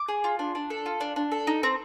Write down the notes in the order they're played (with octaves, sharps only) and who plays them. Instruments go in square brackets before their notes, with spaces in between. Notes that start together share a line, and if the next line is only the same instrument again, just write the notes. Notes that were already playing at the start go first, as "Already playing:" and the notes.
Already playing: [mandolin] D6
G#4
F4
D4
D4
A4
F4
D4
D4
A4
D#4
C4